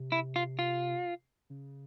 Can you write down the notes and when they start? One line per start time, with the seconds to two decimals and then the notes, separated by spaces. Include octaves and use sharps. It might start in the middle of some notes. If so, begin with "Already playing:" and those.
Already playing: C3
0.12 E4
0.36 F4
0.59 F4
1.50 C#3